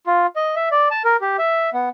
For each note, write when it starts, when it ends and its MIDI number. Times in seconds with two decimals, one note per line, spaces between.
0.07 0.27 65
0.36 0.55 75
0.56 0.69 76
0.71 0.88 74
0.91 1.02 81
1.05 1.17 70
1.21 1.37 67
1.39 1.70 76
1.74 1.89 59